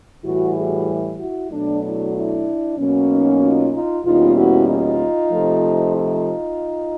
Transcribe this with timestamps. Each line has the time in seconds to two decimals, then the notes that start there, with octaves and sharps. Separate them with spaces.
0.24 A2 E3 G3 E4 F#4
0.56 F#4 G#4
1.19 E4 F#4
1.51 B2 F#3 A3 D4
1.83 D4 E4
2.14 D4 E4
2.77 B2 F#3 A#3 C#4
3.09 D#4
3.41 D#4 F4
3.72 D#4 F4
4.04 E2 B2 G3 A#3 C#4 D#4 F4
4.36 E4 F#4
4.68 D#4 F4
5.32 C3 F3 A3
5.95 D#4 F4